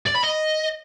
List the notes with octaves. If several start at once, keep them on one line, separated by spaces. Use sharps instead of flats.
D5
B5
D#5